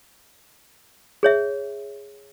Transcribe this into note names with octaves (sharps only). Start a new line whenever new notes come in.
G#4 C#5 E5